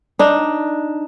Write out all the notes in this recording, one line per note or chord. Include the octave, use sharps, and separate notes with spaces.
D4 D#4